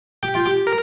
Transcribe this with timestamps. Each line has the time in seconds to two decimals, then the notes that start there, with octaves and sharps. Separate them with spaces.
0.23 G4 G5
0.35 F4
0.46 G4
0.67 A#4